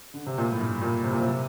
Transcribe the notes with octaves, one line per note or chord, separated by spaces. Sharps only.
D3
C3
A#2
A2
G2
A#2
C3
A#2
C3